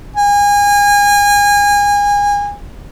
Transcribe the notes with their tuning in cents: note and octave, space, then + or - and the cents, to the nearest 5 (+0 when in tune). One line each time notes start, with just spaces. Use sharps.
G#5 -30